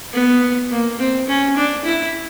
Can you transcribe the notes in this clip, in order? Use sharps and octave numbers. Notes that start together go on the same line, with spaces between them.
B3
A#3
C4
C#4
D4
E4